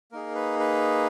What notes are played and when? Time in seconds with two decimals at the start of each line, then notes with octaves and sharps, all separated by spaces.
0.12 A#3 D#4 G#4 A#4
0.35 B4
0.59 B4